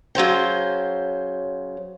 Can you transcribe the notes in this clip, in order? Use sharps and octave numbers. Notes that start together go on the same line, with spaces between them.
C#3 F#3 C5 G5